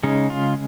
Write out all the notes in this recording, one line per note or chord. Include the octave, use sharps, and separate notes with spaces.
C#3 G#3 C#4 D#4
F4